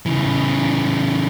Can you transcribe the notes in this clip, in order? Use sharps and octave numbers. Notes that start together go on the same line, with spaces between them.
C#3 E3